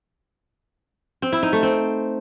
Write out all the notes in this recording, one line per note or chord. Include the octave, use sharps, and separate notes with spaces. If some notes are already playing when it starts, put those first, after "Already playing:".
C4
E4
D#4
A3
C4